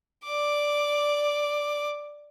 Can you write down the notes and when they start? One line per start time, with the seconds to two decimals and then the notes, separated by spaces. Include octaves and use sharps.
0.24 D5 D6